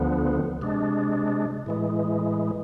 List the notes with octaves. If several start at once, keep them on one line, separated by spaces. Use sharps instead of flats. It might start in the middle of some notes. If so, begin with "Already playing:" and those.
Already playing: D2 D3 F3 B3
C3 G#3 D4
A2 E3 G#3